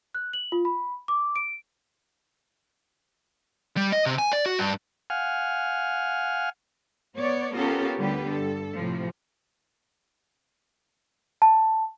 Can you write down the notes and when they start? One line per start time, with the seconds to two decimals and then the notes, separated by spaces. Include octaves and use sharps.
0.15 F#6
0.33 F#7
0.52 F4
0.65 B5
1.08 D6
1.36 D7
3.77 G3
3.92 D#5
4.06 C3
4.18 G#5
4.33 D5
4.46 F#4
4.59 G2
5.10 F5 F#5 G#5 F6
7.16 B3 C#5 D5
7.55 B3 C#4 F4 G4 A4 A#4
7.98 D2 D3 G3 B3 G4 B4
8.30 G2 A4
8.77 A2 C3 F3
11.42 A5